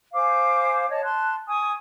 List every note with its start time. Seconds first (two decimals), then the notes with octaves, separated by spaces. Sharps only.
0.13 C5 F5 G#5 D6
0.90 C#5 D#5 A5
1.03 A5 C6 F#6
1.47 G#5 C#6 D#6